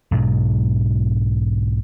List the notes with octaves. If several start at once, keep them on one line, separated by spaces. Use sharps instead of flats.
B1 G#2 B2 F#3